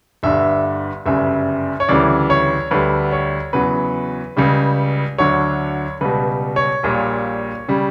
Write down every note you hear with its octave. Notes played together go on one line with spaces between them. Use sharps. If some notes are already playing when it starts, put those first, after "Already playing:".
G1 G2 D3 E5
G1 F#2 C#3 G3 E5
C#5
D2 C#3 E3 G3 D5
C#5
D2 D3 G3 B4
C#5
E2 C#3 F#3 B4
C#2 C#3 G3
D2 D3 F#3 C#5
C#2 B2 G3 B4
C#5
A#1 A#2 G3
C#3 G3